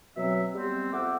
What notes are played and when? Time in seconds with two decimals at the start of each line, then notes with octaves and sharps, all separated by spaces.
0.17 B2 F#3 C4 E5
0.53 G3 B3 C4
0.92 F2 E5 F#5 D6